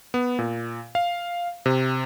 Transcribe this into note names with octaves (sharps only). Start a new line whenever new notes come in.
B3
A#2
F5
C3